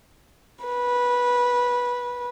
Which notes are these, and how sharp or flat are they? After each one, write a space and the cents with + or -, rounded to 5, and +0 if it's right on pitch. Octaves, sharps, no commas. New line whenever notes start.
B4 -15